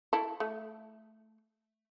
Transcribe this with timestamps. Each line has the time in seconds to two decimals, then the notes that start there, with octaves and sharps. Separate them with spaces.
0.13 E4 A4
0.40 A3